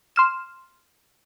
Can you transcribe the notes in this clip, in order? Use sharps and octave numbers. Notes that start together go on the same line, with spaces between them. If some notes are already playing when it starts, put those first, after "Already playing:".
C6 F6 E7